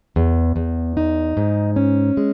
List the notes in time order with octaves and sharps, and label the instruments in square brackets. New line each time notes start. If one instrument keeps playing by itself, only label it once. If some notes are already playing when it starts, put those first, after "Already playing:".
[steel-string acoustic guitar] E2
E2
D#4
G#2
C#4
G#3